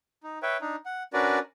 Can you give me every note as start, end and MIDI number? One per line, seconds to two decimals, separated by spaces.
0.23 0.39 63
0.42 0.57 71
0.42 0.57 73
0.42 0.57 76
0.42 0.57 79
0.61 0.76 62
0.61 0.76 63
0.86 1.03 78
1.13 1.39 61
1.13 1.39 62
1.13 1.39 66
1.13 1.39 70
1.13 1.39 71
1.13 1.39 74